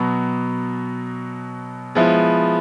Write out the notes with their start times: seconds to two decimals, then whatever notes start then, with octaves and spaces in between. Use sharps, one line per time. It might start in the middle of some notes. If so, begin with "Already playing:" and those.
Already playing: B2 F#3 B3
1.95 F3 G#3 B3 E4